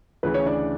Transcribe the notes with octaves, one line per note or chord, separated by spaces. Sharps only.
D2 C#3 E3 B4
C#4 C#5
D4 D5